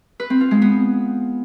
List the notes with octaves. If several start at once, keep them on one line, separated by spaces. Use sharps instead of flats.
B4
C4
F4
G#3
B3